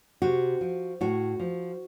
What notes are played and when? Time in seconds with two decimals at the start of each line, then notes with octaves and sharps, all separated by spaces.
0.22 C3 F#4
0.61 F3
1.01 A2 F#4
1.40 F3